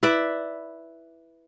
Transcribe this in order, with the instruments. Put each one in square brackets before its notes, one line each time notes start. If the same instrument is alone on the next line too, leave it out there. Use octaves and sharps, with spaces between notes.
[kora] E4 B4 D5 E5